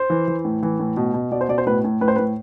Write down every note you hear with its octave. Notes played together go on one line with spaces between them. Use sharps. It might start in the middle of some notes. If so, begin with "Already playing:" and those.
Already playing: C5
E3
E3
A2
E3
A2
B2
B2
B2 D5
C5
B2 D5
C5
A2 B4
A2
A2 B4
C5
B4
A2